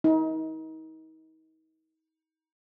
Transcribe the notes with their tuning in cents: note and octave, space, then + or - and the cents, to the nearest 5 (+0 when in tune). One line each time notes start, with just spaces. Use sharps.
D#4 +35